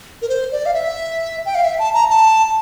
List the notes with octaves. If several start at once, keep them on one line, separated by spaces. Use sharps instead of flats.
A#4
C5
D5
F5
E5
G5
F5
E5
A5
A#5
A5